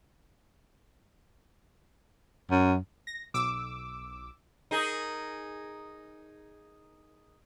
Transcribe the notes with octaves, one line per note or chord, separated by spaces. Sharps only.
F#2
A#6
B1 D6 E6
D#4 G#4 A#4